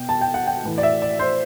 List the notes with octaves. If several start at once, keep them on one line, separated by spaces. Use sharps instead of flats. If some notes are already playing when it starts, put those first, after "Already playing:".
Already playing: B2 G5
A5
G5
F#5
G5
A2 E3
D5
E5
D5
C5